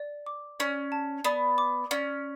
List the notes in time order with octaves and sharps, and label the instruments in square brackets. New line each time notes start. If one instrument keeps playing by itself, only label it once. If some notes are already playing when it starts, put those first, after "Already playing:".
Already playing: [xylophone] D5
D6
[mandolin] C#4 [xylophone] D5
[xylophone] A5
[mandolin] B3 [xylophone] D5
[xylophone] D6
[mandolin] C#4 [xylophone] D5